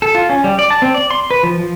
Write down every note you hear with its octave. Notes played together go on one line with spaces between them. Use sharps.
A4
F4
C#4
G3
D5
A5
C4
D5
C6
B4
F3
F3